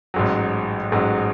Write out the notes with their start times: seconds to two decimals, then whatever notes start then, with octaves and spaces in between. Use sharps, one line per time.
0.14 A1 G#2 F#3
0.92 A1 G#2 F#3